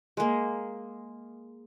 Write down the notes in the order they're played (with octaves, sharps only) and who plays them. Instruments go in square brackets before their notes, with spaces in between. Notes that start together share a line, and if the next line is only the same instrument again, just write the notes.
[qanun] G#3 A#3